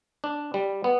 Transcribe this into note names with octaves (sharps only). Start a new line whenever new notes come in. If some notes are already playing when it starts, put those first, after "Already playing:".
D4
G3
B3